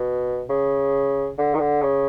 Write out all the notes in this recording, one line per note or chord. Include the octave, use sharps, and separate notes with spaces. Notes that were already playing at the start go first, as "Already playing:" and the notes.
Already playing: B2
C#3
D3
D#3
D3
C#3